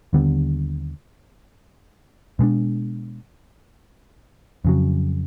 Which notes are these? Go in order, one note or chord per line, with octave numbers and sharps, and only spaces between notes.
D#2 D3 G3 B3
B2 G#3 B3 D4
F2 C#3 F#3